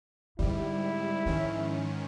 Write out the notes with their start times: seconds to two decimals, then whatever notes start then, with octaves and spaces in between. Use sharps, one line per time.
0.39 G#2 D3 G3 C4 E4
1.26 G#2 D#3 F3 C#4